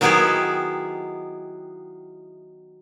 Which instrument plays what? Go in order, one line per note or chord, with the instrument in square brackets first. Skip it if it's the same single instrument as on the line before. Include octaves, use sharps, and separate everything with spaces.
[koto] D#3 F#3 B3 E4 G4 G#4